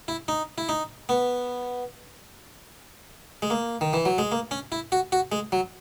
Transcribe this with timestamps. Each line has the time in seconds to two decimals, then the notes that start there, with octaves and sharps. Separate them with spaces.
0.08 E4
0.28 D#4
0.58 E4
0.69 D#4
1.09 B3
3.42 G#3
3.50 A#3
3.81 D#3
3.93 E3
4.05 F#3
4.18 G#3
4.32 A#3
4.51 C#4
4.72 E4
4.92 F#4
5.12 F#4
5.32 G#3
5.52 F#3